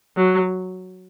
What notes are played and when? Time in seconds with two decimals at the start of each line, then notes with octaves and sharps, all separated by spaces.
0.17 F#3